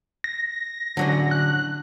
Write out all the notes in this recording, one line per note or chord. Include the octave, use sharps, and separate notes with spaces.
A#6
D3 F#3 C#4
F#6